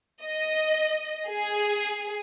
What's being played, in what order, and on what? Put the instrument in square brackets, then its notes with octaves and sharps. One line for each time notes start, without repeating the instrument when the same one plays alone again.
[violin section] D#5
G#4